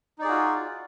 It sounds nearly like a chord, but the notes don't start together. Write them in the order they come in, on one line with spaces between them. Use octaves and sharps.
D#4 D5 G#4 F#4 F4